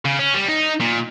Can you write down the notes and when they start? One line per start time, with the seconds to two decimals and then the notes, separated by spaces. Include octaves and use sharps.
0.05 C#3
0.19 C#4
0.34 G3
0.49 D#4
0.81 A#2